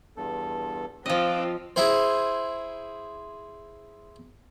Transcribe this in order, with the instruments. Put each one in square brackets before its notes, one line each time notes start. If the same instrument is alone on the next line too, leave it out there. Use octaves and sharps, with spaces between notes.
[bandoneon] E2 G2 A4
[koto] F3 D#5 [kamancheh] C4 F4 [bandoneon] D6 E6 F#6
[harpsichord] E4 G#4 C5